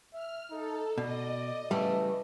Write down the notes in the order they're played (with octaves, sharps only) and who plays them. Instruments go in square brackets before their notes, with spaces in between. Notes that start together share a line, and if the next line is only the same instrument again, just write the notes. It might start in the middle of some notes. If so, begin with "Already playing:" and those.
[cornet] E5 [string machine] F6
[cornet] D#4 [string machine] A4
[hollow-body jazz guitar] B2 [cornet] D5 [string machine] D#5
[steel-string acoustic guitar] C#3 E3 A3 [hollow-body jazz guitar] G3 [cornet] E5